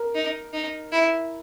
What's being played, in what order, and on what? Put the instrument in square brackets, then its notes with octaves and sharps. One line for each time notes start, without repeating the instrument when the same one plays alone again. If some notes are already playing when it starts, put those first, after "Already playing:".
Already playing: [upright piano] A#4
[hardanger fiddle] D#4
D#4
E4